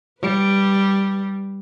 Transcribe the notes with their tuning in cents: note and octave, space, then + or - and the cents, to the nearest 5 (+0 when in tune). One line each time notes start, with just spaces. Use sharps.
G3 +0 B4 +0